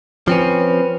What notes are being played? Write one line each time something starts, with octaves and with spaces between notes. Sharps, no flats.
F3 C4 C#4 B4